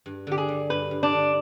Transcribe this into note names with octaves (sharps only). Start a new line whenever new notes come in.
G2
D3 G4
G#4
G3
G2 B4
G2
D4
D3